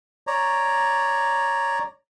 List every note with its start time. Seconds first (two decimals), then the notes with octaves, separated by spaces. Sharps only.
0.27 C#5 D5 A#5